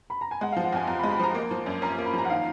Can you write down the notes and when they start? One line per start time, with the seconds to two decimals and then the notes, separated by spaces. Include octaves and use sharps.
0.10 B5
0.21 A#5
0.31 G#5
0.41 G#3 F#5
0.52 F5
0.57 F3
0.65 F#5
0.72 F2 G#5
0.88 F2 A#5
0.99 B5
1.03 G#3
1.11 B5
1.19 F3 A#5
1.35 A#3
1.51 F3
1.66 F#2
1.82 C#4 A#5
1.98 A#3
2.06 B5
2.14 F3 A#5
2.25 F#5
2.30 D#3 F5